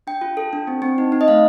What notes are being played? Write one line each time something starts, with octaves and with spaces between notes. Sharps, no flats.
D4 G5
F4
A4
D4
C4
C4
D#4
D#4
D#5
A3 F5